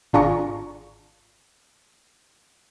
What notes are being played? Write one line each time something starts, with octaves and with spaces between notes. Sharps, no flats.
G#1 D4 F4 G#4 A#5 C#6